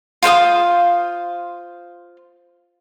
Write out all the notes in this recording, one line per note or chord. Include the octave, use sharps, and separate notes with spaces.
F4 C5 F5 D#6